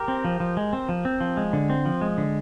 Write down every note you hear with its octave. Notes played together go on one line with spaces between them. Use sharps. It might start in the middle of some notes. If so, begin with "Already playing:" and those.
Already playing: G4 A#4
C4
F3
F3
G#3
C4
F3
C4
F3
G#3
D3
C4
F3
G#3
D3